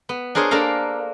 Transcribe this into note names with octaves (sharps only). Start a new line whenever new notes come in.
B3
D4 G#4 A#4 C5 C#5 D#5
A#3 D4 A4 F5 A#5